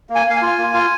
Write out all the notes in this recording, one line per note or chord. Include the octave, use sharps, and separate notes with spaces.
A#3
G#5
A#3 F5
G#5
F4
A#3
F4